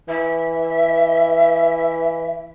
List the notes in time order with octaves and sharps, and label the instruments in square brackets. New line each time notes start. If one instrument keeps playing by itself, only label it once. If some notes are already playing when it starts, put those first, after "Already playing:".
[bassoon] E3 [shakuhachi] E5